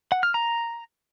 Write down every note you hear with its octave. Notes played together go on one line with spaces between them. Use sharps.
F#5
F6
A#5